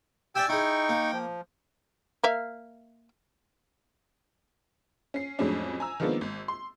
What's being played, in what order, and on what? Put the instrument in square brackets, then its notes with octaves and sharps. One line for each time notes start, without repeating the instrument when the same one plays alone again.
[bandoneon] G4 [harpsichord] D5 E5 G#5 [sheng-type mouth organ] G5 E6
[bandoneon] D#4 C#6 [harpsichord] E4 G#4 [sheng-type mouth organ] G5
[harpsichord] A#3
[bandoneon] F3
[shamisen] A#3 E5 F5
[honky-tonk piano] C#4 C7
F2 A2 F#3 G#3 C#4 D4
G#5 A#5 E6
D#3 F3 G#3 A#3 B3 D4
G#1
C6